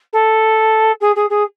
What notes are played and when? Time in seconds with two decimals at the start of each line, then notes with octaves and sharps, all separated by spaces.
0.12 A4
1.00 G#4
1.15 G#4
1.29 G#4